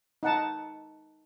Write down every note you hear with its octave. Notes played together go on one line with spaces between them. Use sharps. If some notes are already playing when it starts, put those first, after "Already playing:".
D#4 F#5 A5